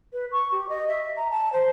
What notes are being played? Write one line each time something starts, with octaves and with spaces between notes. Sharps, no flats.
B4
C#6
G4
D#5
E5
A#5
A5
C5